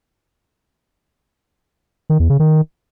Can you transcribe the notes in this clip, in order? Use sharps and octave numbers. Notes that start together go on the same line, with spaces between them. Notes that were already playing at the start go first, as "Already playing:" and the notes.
D#3
E2
C#3
D#3